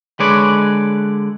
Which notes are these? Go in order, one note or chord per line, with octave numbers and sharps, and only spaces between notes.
D3 G#3 B4 C#5 D5